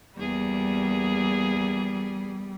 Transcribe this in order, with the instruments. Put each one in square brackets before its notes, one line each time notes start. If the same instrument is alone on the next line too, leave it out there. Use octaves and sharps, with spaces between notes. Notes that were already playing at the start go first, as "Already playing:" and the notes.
[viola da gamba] E2 A#3 G#4 [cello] G3